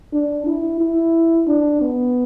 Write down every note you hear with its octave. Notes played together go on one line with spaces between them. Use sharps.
D4
E4
E4
D4
B3